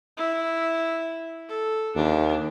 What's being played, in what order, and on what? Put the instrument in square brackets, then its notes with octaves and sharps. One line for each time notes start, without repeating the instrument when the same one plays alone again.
[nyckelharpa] E4
A4
[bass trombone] D#2 [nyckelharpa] D4